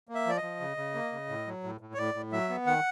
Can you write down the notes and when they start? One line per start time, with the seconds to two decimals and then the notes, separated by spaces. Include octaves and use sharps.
0.09 A#3
0.15 E5
0.26 F3 D5
0.37 D#5
0.43 F3
0.60 C#3
0.77 C#3
0.94 A#3
1.12 C#3
1.29 A2
1.47 F#3
1.64 A2
1.81 A2
1.94 C#5
1.98 A2 D5
2.14 A2
2.32 F#3 E5
2.49 B3
2.67 D#3 F#5